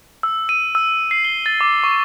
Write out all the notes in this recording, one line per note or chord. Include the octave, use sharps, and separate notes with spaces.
E6
D#7
E6
C7
G7
A6
D6
C#6